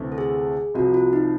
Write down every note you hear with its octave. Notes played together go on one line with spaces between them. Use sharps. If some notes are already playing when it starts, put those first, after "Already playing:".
Already playing: D2 C3 E3 A3
A4
G#4
C2 C3 F3 F#4
F4
D#4